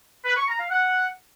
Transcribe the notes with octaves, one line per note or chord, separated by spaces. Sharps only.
B4
C#6
A#5
F5
F#5